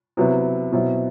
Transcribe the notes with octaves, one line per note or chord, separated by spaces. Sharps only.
C3 F#3 B3 E4
B2 F#3 C4 E4